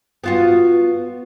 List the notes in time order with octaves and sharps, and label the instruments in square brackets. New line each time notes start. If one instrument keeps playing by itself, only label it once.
[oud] B3 F4 F#4